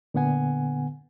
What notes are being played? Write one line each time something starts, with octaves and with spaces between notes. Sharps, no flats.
A#2 D3 B3 F#5 G#5